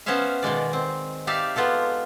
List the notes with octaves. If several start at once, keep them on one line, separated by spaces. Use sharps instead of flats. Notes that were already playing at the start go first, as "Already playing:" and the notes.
B3 C#4 C5 C#5 E5 F5
B2 D#3 G#3 D5
C4
D#4 G4 D5 E5 F5
G#3 B3 F4 G4 A4